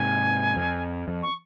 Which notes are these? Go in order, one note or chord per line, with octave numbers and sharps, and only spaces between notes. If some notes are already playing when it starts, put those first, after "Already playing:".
Already playing: G#2 C3 G#5
F2
F2
C#6